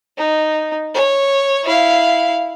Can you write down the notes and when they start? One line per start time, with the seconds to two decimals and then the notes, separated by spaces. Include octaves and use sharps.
0.17 D#4
0.94 C#5
1.65 E4 F5